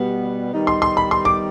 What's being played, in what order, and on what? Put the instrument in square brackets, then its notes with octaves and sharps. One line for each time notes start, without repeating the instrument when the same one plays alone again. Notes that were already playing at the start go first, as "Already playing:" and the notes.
Already playing: [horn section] B2 G3 B3
D#3 G3 B3 D#4
[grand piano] C6
C6
B5
C6
D6